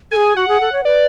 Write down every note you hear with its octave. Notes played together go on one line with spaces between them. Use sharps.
G#4 A4 G#5
F#4 F#5
G#4
A4
C#5
B4 D5